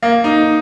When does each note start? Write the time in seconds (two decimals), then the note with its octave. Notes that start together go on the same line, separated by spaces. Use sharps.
0.03 A#3
0.24 D#4